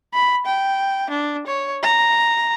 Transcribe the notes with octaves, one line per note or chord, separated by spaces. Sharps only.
B5
G5
D4
C#5
A#5